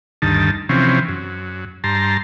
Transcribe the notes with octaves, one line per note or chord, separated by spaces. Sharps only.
D2 G2 D#3 A5
C3 E3 F3 C4 C#4
F#2
G2 A5 A#5 C6